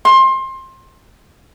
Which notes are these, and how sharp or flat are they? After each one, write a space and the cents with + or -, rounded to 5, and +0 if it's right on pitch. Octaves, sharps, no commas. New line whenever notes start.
C6 +25